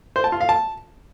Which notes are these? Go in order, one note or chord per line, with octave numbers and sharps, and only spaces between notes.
C5
A5
F4
F5
A5